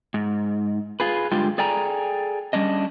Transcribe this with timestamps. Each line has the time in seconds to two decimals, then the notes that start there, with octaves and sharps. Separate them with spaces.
0.14 G#2
1.00 F4 G#4 B4
1.31 G2 D3 G#3 F4 G4
1.58 G#4 A4 D5 G5 G#5 A#5
2.53 G3 C#4 D4 D#5